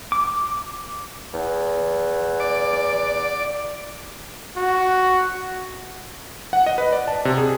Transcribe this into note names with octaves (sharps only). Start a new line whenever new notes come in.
D6
E2
D5
F#4
F#5
D#5
B4
D5
A5
C3
G#4